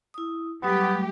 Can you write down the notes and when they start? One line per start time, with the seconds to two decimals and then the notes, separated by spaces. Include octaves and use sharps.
0.14 E4 D#6
0.63 F#3 G3 A3 B3 G4